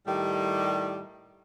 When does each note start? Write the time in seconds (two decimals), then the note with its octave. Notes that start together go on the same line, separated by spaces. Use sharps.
0.07 A2 D#3 G3